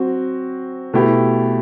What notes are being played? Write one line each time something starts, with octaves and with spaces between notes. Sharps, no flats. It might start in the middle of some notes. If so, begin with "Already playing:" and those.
Already playing: F#3 C4 F#4
B2 A3 E4 G4